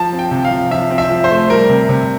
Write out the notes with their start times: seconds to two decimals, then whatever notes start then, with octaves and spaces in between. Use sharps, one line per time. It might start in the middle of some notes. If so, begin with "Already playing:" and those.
Already playing: F3 A5
0.13 C4
0.19 G5
0.31 C3
0.45 F5
0.51 F3
0.71 F3 E5
0.90 C4
0.98 E5
1.10 F3
1.24 C5
1.31 A3
1.50 G3 A#4
1.69 C3
1.89 C3